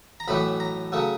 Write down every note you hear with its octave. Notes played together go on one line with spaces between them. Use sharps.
A#5
B1 A2 E3 A3 B5
A#5
C#3 F#3 A3